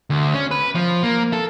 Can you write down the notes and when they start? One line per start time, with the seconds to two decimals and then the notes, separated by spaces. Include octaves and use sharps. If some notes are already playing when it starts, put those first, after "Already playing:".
0.10 D2
0.34 C#4
0.51 B4
0.75 F3
1.03 A#3
1.33 A4